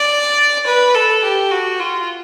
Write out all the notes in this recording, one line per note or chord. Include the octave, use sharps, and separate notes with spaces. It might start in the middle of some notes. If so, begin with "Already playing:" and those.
Already playing: D5
B4
A4
G4
F#4
F4